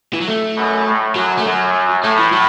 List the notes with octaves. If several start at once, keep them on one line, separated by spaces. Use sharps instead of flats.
E3
F#3
A3
F#2 B2
A2
F#2 F#3
A3
F#2 F#3
A2 A3
E3
F#3